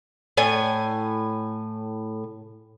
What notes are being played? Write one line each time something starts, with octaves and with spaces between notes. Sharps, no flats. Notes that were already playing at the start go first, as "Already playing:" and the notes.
A2 G#5